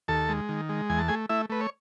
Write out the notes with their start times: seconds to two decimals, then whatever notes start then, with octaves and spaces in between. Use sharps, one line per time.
0.08 D#2 A4 A5
0.29 G#3
0.49 D#3
0.69 G#3
0.90 E2 G#5
0.99 A5
1.08 A3 G#4 G#5
1.29 A3 E4 E5
1.50 A3 B4
1.61 C#5